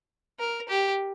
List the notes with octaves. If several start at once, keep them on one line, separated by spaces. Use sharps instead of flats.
A#4
G4